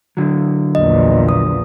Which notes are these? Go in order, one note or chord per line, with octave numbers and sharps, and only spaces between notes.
D3 F#3
A#1 E2 A#2 D#5
D#6